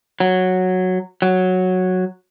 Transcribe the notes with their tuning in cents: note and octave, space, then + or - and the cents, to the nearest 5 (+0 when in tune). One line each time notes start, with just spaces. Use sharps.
F#3 -5
F#3 -5